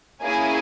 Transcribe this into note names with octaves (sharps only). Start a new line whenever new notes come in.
A#3 C#4 E4 G#4 G#5